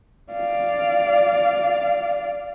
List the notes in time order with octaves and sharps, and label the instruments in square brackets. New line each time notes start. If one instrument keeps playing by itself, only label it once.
[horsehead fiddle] D5 F5